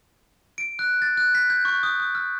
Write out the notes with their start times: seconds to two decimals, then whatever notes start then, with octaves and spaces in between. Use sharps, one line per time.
0.58 D7
0.79 F#6
1.02 A6
1.17 F#6
1.35 B6
1.50 G6
1.65 C#6
1.83 D#6
2.00 D#6
2.15 F6